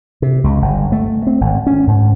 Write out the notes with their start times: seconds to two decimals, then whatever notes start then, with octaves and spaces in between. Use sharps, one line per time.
0.22 C3
0.44 C#2
0.62 G1
0.92 A3
1.27 C4
1.41 G#1
1.67 C#4
1.87 G#2